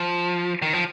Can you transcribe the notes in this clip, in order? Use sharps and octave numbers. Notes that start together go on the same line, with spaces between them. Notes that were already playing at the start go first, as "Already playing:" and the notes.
Already playing: F3
D#3
F3